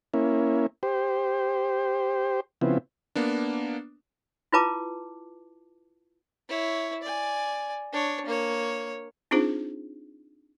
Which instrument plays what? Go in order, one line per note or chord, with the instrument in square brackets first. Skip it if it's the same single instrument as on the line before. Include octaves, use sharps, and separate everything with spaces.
[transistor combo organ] A#3 C#4 E4
G4 C5
C#3 F3 B3 C4 E4
[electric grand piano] A#3 B3 D4
[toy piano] E4 F4 B4 A5 D6
[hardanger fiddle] E4 C#5
D5 G#5
D4 C#5
A#3 C#5
[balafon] C4 D4 D#4 F4 G#4 C5